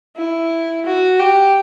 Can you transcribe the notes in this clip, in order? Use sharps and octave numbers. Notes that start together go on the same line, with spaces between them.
E4
F#4
G4